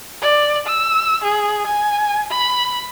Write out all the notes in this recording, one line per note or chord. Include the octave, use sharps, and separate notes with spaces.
D5
E6
G#4
G#5
B5